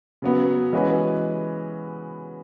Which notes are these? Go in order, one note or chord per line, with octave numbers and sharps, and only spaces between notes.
C#3 F#3 B3
E3 G#3 C#4 F#4 B4